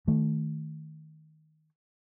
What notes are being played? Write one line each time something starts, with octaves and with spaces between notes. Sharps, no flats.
D#3 A3